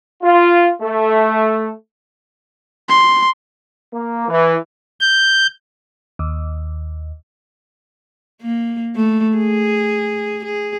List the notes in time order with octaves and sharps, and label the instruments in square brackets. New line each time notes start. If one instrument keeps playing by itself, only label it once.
[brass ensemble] F4
A3
[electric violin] C6
[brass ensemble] A#3
E3
[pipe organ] G6
[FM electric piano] D#2
[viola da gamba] A#3
A3
G#4
G#4